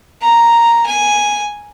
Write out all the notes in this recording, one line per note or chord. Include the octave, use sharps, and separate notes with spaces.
A#5
G#5